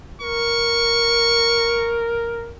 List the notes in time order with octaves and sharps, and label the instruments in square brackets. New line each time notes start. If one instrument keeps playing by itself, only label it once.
[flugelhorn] A#4 [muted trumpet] C#6